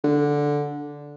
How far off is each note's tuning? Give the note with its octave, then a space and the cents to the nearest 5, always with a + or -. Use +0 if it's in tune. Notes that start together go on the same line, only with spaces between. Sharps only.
D3 -5